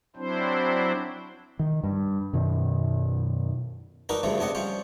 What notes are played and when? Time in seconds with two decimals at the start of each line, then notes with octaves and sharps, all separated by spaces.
0.16 F#3 C4 D4 E4 C5
1.59 D#3
1.84 G2
2.33 F#2 B2 D#3
4.09 D4 D#4 F#4 A#4 B4
4.23 D2 G2 C#3 F3 A3
4.38 C#2 C3 D4 D#5 F#5
4.55 F3 G3 C#4 C5